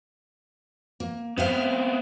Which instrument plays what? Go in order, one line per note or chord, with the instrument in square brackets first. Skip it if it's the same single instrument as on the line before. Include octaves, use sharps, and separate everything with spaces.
[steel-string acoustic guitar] A#3
[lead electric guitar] B3 C4 [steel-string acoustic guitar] C5 E5 F5